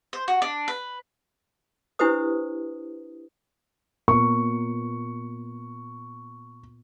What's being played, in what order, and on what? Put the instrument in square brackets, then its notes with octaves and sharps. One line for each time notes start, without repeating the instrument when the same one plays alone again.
[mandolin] C5
F#4
D4
B4
[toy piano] D4 E4 G4 B4 C5 D#6
[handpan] A#2 B3 A#4 [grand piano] C#6